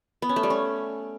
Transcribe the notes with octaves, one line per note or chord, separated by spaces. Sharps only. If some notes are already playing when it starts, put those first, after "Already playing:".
B3
C#4
A3
G3
C#4